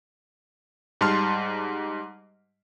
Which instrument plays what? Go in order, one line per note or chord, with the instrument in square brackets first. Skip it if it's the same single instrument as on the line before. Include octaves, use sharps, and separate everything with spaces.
[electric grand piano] G#2 G3 A5 C6 F6